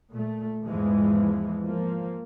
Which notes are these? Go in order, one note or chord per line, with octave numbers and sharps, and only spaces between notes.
A#2 A3
E2 G#2 E3 F3 G#3
F3 A#3